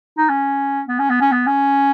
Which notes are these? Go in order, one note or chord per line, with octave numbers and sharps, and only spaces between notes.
D#4
C#4
B3
C#4
B3
C#4
B3
C#4